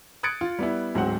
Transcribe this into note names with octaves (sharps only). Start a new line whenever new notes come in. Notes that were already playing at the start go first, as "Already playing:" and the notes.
D#6 F#6 G#6 A6 C#7 D7
F4
G3 B3 E4
D1 G#2 F#3 C4 C5 F#5